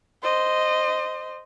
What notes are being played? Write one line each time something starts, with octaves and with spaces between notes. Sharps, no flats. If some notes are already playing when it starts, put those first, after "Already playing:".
C5 D#5